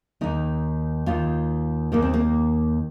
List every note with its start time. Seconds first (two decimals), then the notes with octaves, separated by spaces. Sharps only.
0.21 D#2 D#3 D#4
1.06 D#2 D#3 F4
1.92 D#2 D#3 A#3
2.02 C4
2.14 A#3